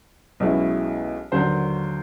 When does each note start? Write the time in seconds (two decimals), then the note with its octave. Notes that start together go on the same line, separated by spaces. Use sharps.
0.40 B1 B2 G#3 C#4 E4
1.32 D#2 D3 F#3 C5